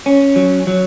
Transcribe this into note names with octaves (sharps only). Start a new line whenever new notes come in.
C#4
F#3
F#3